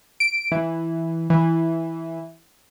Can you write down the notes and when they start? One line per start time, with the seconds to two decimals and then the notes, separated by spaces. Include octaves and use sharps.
0.20 D7
0.52 E3
1.30 E3